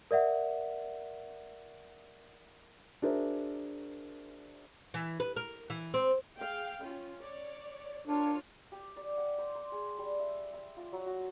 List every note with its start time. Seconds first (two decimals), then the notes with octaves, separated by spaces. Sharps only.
0.11 A#4 D5 E5 F#5
3.02 D4 F#4 G#4 A#4 C5 E5
4.94 E3
5.20 B4
5.36 A#4
5.70 E3
5.94 C4
6.38 G#4 F5 G5
6.81 C#4 F4
7.21 C#5 D5
8.08 D4 F4 A#4 C#5
8.72 G4
8.96 D5
9.17 F#5
9.38 C5
9.55 C6
9.72 G#4
9.98 G3
10.20 E5
10.53 E5
10.77 F4
10.92 F#3
11.06 F#4